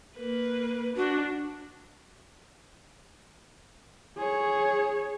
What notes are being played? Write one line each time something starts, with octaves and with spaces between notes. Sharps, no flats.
A#3 B4
D4 F#4
G#4 C#5